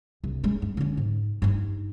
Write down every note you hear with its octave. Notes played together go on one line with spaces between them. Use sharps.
C2
G#3 C#4
G2
D3 C#4
G#2
G2 D#4